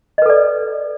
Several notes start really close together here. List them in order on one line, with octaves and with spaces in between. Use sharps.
D#5 B4 A4 D5